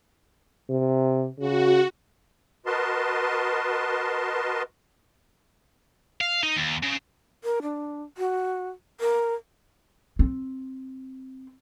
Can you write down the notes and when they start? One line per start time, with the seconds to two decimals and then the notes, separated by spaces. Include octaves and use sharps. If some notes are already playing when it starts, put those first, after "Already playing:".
0.70 C3
1.39 C#3 F#4
2.66 F#4 A#4 B4 D#5 A5 C6
6.21 F5
6.43 D#4
6.56 D#2
6.83 C#3
7.44 A#4
7.62 D4
8.18 F#4
9.01 A#4
10.19 C4